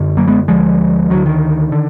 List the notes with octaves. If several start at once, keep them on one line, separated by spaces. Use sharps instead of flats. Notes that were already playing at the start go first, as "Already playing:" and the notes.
Already playing: F#2 D3
F#3 A#3
G#3 B3
D2 D3 F3 G#3
D2 D3 D#3 F#3
D#3
D3